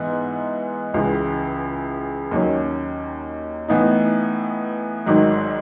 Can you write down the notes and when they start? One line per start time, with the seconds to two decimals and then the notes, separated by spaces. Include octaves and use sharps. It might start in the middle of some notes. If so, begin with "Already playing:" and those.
Already playing: G#2 E3 B3
0.94 C#2 C#3 E3
2.31 D#2 D#3 F#3 C#4
3.68 A2 E3 B3 D#4
5.06 G#1 G#2 D#3 F#3